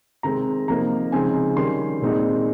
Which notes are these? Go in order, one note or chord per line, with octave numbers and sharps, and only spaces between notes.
C3 D#3 G#3 C4 A#5
C3 F3 A#3 D#4 A#5
C#3 F3 G#3 C4 D#4 G#5
D#3 G3 C#4 C6
A#2 G#3 C4 D#4